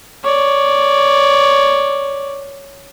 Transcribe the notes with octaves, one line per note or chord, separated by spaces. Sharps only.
C#5 D5